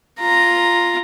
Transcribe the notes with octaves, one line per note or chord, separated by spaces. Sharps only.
F4 A#5